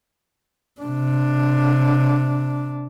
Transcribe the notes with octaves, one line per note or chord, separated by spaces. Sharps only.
C3 D4